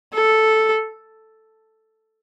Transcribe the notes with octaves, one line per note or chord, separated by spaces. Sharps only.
A4